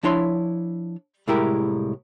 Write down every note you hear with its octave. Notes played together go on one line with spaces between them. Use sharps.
F3 D4 E4 C#5 C6
C2 A2 G#3 E4 G4 A#4